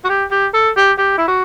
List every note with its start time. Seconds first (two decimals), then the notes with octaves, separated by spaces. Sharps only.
0.05 F#4
0.09 G4
0.31 G4
0.54 A4
0.76 G4
0.98 G4
1.18 E4
1.28 F#4